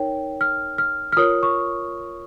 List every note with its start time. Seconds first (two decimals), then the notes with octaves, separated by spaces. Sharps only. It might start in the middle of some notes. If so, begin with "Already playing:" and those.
Already playing: D#4 A#4 C#5 G5
0.41 F6
0.78 F6
1.12 F6
1.17 F4 A#4 C#5 D#6
1.43 C#6